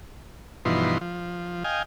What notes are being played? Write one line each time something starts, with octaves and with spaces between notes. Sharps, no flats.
G2 B2 E3 F3 D#4 C6
F3
D#5 F5 G5 G#5